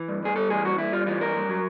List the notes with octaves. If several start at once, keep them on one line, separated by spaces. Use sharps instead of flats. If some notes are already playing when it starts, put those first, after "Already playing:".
Already playing: E3
G2
G2 G#4
G3 A4
E3 G#4
G2 F#4
G2 E4
G3 F4
E3 F4
G2 A#4
G2
F#3